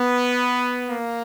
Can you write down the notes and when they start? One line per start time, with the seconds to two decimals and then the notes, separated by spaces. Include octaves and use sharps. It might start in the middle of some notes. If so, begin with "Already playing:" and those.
Already playing: B3
0.89 A#3